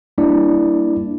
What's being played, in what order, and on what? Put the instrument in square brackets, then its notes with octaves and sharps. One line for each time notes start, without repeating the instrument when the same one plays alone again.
[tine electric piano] G3 A#3 D4 E4 D5